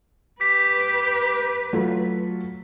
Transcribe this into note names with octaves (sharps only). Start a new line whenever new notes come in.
G4 B4 B6
F#3 A3 F4